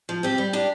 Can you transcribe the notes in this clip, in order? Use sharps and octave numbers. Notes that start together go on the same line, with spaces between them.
F3
C4 G4
G3
D4 G4